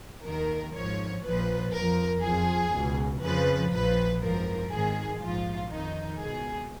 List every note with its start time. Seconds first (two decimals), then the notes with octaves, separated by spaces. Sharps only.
0.25 D#2 D#3 A#4
0.75 G#1 G#2 F3 C#5
1.24 A#1 A#2 F3 B4
1.74 F2 F3 A#4
2.23 F2 F3 G#4
2.73 C#2 B2
3.22 F2 C#3 F3 B4
3.72 A#1 A#2 F3 B4
4.21 G#1 F#2 F3 A#4
4.70 G#1 G#2 D#3 G#4
5.20 A#1 G#2 F3 F4
5.70 F2 D#3 D#4
6.19 C#2 B2 G#4